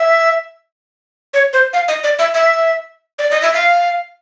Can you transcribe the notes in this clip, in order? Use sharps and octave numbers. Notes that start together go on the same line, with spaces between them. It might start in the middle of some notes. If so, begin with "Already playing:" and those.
Already playing: E5
C#5
C5
F5
D#5
D5
E5
E5
D5
D#5
E5
F5